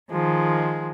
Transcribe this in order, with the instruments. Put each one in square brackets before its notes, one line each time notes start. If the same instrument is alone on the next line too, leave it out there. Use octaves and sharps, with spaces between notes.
[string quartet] D#3 F3 G#3